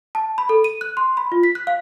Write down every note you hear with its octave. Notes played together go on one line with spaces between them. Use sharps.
A5
B5
A4
D#7
F#6
C6
B5
F4
B6
F#6
F5